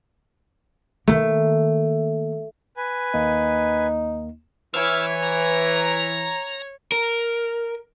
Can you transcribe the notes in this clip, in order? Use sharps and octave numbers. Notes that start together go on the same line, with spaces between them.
D#3 A3 A#3
B4 G#5
D#2 A#3 D#4
E3 C#5 E6 F6
A#5
A#4